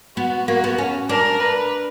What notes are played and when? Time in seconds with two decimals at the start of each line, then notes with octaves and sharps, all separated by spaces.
0.17 B3 F#4
0.48 A#3 F#4
0.64 B3
0.78 C#4
1.09 D4 A#4
1.40 B4